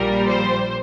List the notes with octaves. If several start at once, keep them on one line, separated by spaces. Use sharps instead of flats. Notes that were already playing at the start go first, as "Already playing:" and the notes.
Already playing: A#1 A#2 G3 A#4
C5